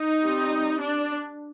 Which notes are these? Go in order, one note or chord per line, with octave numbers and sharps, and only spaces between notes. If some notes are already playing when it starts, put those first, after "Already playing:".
Already playing: D#4
G3 C4
D4